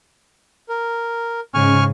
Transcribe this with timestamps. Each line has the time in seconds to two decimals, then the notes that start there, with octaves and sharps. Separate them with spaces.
0.69 A#4
1.54 G#2 C#3 G#5 C#6 F6